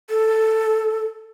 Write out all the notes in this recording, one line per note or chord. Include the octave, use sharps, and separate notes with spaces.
A4